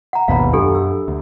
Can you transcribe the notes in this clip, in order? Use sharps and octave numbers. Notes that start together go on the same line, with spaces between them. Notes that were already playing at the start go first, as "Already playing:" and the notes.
F#5 A#5
G#1 D#2 B2 F5 A#5 B5
F#2 D4 G4 A4
E6
D2